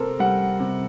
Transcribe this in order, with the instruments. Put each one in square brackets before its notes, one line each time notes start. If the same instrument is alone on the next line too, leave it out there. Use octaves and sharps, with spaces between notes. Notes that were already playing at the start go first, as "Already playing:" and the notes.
Already playing: [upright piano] C3 C4 [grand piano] A4 A#4
[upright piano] G3 [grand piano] F#5
[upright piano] C3